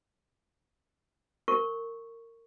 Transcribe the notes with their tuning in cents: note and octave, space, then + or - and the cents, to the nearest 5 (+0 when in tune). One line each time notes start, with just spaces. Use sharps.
A#4 -25 C#6 +0